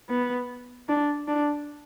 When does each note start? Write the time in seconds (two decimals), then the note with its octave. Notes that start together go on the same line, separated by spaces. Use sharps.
0.09 B3
0.89 D4
1.28 D4